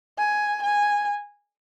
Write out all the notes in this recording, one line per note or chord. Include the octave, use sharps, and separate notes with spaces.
G#5
G#5